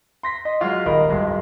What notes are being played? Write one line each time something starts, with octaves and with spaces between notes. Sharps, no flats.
C6 A#6 B6
D#5
F#3 G#3 F4 F#4
D#1 D#3 A#4 D#5 B5
D1 G2 G#3